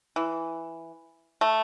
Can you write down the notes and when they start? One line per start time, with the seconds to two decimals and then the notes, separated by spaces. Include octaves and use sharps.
0.16 E3
1.41 A3